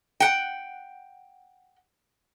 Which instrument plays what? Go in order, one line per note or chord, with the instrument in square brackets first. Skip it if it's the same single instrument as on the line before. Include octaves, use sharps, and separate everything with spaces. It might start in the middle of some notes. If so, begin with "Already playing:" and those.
[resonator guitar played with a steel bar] F#5 G5